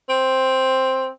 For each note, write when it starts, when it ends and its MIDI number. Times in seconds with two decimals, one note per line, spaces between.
0.09 1.08 60